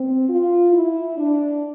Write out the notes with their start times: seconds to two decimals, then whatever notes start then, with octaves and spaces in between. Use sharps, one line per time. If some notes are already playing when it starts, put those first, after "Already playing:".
Already playing: C4
0.28 F4
0.72 E4
1.17 D4